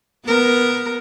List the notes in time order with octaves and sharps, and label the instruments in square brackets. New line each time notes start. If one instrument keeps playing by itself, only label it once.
[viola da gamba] B3 A#4